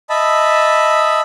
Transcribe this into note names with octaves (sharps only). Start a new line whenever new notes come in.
D#5 E5 A5 B5